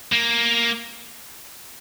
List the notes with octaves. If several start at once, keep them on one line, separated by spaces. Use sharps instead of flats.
A#3